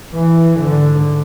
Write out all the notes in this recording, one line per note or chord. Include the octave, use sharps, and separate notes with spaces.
E3
G#2 D3